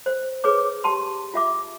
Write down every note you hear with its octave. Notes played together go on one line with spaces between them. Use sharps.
C5
G#4 B4 C#5 D6
G4 A5 C6
F4 E5 D6